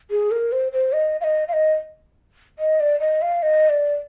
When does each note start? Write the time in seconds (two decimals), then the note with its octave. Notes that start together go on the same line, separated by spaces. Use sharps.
0.11 G#4
0.31 A#4
0.52 C5
0.72 C5
0.93 D#5
1.21 F5
1.24 D#5
1.48 F5
1.53 D#5
2.59 D#5
2.80 D5
3.00 D#5
3.22 F5
3.43 D#5
3.70 D5